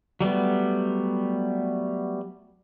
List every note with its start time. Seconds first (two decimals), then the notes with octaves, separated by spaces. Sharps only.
0.20 F#3 G3 A3 B3